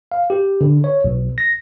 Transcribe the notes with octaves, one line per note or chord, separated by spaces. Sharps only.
F5
G4
D3
C#5
B1
A#6